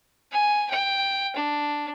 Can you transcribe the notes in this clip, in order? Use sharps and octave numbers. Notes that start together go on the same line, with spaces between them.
G#5
G5
D4